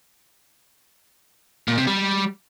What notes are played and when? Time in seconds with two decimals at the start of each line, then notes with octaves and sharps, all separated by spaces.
1.68 A#2
1.78 C3
1.87 G3